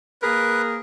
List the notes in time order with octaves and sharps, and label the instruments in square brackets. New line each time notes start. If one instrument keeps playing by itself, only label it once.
[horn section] A#3 G#4 A#4 [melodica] B4